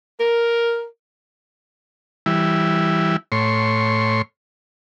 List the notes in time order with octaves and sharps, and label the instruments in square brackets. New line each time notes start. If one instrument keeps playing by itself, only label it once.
[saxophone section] A#4
[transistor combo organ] E3 G3 E4
A2 C#5 C6